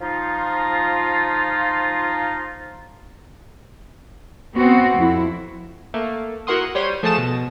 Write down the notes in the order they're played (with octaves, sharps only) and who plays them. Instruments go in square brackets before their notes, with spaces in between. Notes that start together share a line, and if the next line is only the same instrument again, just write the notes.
[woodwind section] F3 D#4 F4
[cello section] B3 C4 F#4
F2 E4
[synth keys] A3 A#3
E4 F#4 A#4 F#5 C6 D#6
G3 C5 C#5 C6 D#7
F3 A3 G#4 A5 D#6 E7
B2